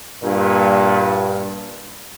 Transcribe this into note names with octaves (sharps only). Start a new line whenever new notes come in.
G2 A#2